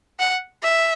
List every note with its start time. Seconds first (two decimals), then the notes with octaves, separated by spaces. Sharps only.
0.19 F#5
0.63 E5